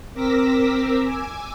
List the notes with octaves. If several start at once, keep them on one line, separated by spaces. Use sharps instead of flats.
C4 A#4 D6 E6 A#6 B6
G#5 D6 E6